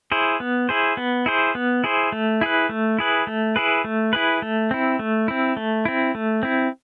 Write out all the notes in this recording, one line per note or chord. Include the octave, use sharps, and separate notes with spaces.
E4 G#4 C5
B3
E4 G#4 C5
B3
E4 G#4 C5
B3
E4 G#4 C5
A3
E4 G#4 B4
A3
E4 G#4 B4
A3
E4 G#4 B4
A3
E4 G#4 B4
A3
C4 E4
A3
C4 E4
A3
C4 E4
A3
C4 E4